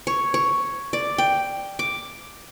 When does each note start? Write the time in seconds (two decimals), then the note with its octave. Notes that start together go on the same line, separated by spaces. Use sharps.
0.07 C#5
0.34 C#5
0.93 D5
1.18 G5
1.79 D6